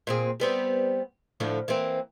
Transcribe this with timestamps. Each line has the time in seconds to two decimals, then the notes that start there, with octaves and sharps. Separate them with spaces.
0.07 A#2 C4 G#4
0.40 G3 B3 C4
1.40 A2 D3 F3
1.68 E3 A#3 C4